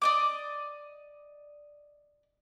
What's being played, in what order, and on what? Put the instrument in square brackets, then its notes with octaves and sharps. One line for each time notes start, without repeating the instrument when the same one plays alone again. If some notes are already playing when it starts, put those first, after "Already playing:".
[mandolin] D5 D#5 D6